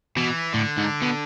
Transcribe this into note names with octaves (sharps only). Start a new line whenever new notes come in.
B2 E3
A2 D3
G#2
B2